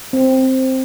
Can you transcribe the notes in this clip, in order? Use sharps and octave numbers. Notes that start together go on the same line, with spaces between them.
C4